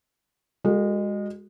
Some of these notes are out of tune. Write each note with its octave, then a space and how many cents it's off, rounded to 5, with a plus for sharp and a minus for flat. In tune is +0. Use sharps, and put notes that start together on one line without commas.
G#3 -25 F#4 +0 A4 +25